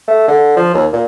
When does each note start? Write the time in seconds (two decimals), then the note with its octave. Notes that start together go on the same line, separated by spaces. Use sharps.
0.08 A3
0.28 D3
0.57 F3
0.74 D#2
0.93 A#2